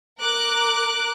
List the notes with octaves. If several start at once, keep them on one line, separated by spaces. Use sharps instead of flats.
A#4 D6 F#6